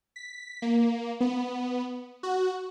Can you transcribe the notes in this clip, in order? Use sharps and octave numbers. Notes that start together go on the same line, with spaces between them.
B6
A#3
B3
F#4